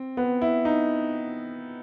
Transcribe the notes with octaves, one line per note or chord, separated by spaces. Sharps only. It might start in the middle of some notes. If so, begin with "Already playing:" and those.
Already playing: C4
B3
E4
D#4